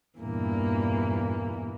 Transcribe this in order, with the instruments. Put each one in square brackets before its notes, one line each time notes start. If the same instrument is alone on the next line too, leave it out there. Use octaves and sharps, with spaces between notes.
[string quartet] E2 G2 A#2 E3 A#3